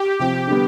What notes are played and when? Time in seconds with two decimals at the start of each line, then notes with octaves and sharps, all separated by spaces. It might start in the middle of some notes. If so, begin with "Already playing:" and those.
Already playing: G4
0.19 C3 F3 C4 G4
0.47 D3 G3 B3